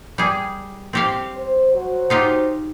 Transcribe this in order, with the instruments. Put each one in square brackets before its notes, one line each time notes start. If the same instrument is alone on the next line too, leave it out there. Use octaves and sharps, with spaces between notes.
[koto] G3 G#4
C4 G4 F5
[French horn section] C5
F#3 F#4 C5
[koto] D#4 F4 G4